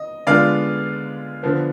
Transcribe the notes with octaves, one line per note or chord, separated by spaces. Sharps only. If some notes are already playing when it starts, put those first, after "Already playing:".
Already playing: D#5
D3 G#3 B3 D4 F4 D5 F5
D3 F3 B3